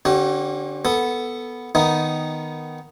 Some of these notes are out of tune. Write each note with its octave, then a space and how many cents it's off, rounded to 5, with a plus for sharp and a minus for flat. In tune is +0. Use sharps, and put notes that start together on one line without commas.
D3 -5 C#4 -40 G4 -45
B3 +0 A4 +0
D#3 +0 B3 +0 D#4 +0